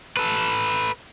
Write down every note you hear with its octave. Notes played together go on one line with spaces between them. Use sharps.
A4 B4